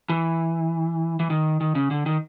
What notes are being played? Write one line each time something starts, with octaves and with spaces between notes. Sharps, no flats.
E3
E3
D#3
D#3
C#3
D3
D#3